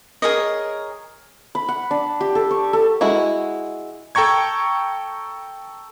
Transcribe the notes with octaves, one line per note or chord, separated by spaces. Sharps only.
G#4 A#4 C#5 D#5
B5
F#5
D4
G4
A4
C#6
A4
G#3 E4 F#4
A4 G5 A#5 C#6 G#6